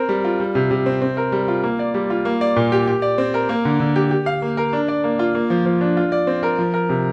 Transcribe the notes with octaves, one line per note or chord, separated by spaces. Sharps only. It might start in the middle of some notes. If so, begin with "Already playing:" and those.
Already playing: C4 A#4
G3
F4
G3
C3
C3
C4
C4
A#4
G3
F4
A#3
D5
G3
F4
A#3
D5
A#2
G4
G4
D5
C4
A#4
A#3
D3
D3
G4
G4
F5
A#3
A#4
D4
D5
A#3
F4
A#3
F3
F3
D4
F4
D5
C4
A#4
F3
A#4
C3